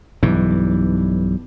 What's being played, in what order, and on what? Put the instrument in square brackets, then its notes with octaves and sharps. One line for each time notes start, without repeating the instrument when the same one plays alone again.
[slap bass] B1 G2 E3